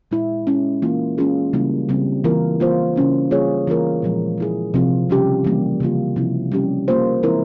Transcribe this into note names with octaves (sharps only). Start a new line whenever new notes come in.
A#2 G#3 E4
G#3 C#4 E4
E3 A#3 F4
G#3 C#4 F4 G#4
C#3 E3 G3 A#3 E4
C#3 G3 C4
E3 A#3 F4 A#4
A#3 F4 C5
C#3 G3 C#4 E4
G3 A#3 F4 G#4 C#5
E3 A#3 F4 A#4
A#2 F3 G#3
G#3 E4 G#4
C3 F3 C4 F4
C#3 G3 C#4 G4
E3 G3 A#3
C#3 F3 A#3 F4
C3 F3 C4 E4
G3 C#4 G4
A#3 F4 C5
E3 G#3 C4 E4 A#4